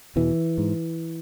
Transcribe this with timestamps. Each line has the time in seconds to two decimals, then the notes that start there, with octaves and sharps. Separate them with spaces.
0.16 E2 B2 E3
0.58 G#2